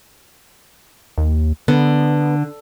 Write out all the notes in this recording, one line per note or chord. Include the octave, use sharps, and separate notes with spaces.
D#2
D3 B3